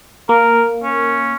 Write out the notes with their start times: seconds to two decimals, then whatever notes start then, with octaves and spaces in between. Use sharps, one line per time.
0.29 A#3 A#4
0.83 C#4